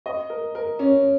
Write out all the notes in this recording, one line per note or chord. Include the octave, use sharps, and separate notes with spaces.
D#5
A#4
A#4
C#4